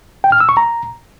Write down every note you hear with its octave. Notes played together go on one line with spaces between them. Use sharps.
G5
F6
E6
C#6
A#5